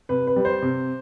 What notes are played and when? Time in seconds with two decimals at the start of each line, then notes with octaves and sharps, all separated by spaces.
0.09 C3 B4
0.27 B4
0.36 G3
0.45 C5
0.62 C3